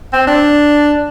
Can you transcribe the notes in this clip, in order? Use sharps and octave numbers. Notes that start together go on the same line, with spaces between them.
C4
D4